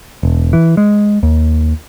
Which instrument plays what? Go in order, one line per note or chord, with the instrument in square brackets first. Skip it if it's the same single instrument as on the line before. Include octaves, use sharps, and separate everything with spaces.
[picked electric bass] E1
E3
G#3
D#2